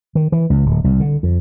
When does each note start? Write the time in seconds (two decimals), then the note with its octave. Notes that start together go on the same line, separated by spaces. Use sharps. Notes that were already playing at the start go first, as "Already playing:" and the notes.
0.15 D#3
0.32 E3
0.50 C#2
0.65 D1
0.84 C2
1.00 D3
1.23 F2